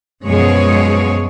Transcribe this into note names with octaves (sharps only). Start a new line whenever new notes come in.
F#2 B2 F3 G#3 G#4 C#5